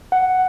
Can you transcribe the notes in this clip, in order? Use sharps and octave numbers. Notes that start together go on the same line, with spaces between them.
F#5